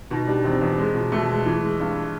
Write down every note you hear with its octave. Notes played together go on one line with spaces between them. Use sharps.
B2 D#4
G3 D4
E2 C4
E2
G#3
B2
B2 A3
G#3
E3
G#3
G2